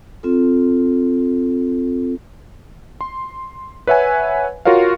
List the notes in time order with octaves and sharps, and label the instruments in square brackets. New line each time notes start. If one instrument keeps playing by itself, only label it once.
[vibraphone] C4 F4 A4
[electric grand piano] C6
B4 C#5 E5 F#5 G#5
F4 F#4 A#4 C#5 F5